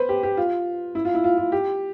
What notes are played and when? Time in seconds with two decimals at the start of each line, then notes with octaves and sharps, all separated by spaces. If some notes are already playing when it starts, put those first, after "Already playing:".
Already playing: B4 C5
0.09 G4
0.23 G4
0.37 F4
0.95 E4
1.05 F4
1.14 E4
1.24 F4
1.37 F4
1.52 G4